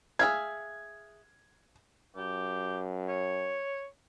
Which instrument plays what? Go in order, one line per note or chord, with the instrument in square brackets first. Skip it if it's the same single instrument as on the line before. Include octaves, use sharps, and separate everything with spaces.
[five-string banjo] G#4 E5 F5 [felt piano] G#6
[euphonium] F#2 [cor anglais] G4
[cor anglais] C#5